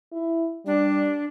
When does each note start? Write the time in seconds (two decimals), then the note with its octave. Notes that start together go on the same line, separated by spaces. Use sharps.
0.12 E4
0.66 G3 D4